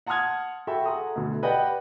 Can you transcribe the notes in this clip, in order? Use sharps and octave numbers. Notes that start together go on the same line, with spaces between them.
F#5 A5 C6 D#6 F6 G#6
F#4 A4 E5 G5 B5 C#6
G#4 A4 F#5 A#5 C6 D#6
D2 B2 D3
G4 B4 D5 D#5 F#5 G5